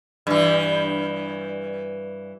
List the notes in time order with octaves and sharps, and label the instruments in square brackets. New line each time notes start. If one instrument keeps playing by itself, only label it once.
[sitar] G2 E3